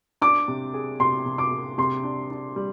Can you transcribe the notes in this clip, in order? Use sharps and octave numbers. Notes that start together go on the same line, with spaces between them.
D4 D6
C3
G#4
C3 C6
C3
D6
C3
C3 C6
D4
D4
G3